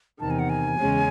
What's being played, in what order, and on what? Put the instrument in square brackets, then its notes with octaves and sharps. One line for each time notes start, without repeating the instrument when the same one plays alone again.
[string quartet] E2 C3 D#3 [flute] A5
[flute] G#5
F#5
G#5
[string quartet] E2 C#3 G#3 C#4